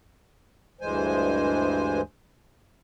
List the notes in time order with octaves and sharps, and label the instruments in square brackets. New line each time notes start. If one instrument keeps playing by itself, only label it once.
[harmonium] D2 G2 E3 G#3 C5 G#5